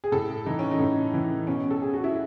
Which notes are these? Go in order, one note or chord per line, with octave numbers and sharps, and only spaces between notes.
G#4
A2 A4
E3 D#4
C#4
D#4
A2
E3
B2 C#4
A4
G#4
F#4
E4